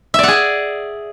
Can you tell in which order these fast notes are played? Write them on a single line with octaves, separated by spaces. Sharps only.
E5 D5 F#5 G#4